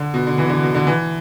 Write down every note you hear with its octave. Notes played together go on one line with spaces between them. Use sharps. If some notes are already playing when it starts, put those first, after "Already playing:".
Already playing: D3
B2
D3
E3
B2
D3
B2
D3
E3